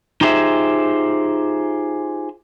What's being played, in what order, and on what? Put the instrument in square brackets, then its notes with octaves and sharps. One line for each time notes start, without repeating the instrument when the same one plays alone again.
[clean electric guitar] D#4 F4 G4 G#4 C5 E5